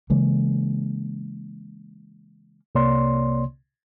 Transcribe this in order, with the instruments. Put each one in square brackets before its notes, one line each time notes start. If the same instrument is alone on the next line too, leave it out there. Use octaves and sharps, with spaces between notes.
[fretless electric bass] C#3 E3 G#3 A#3
[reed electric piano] C2 C3 A#3 C#5 D5 C6